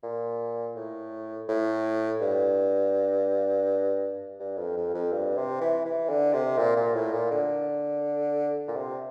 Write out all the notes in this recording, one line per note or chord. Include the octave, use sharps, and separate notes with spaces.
A#2
A2
A2
G2
G2
F2
F2
F2
G2
C3
E3
E3
D3
C3
A#2
A#2
A2
A#2
D3
A#2
C3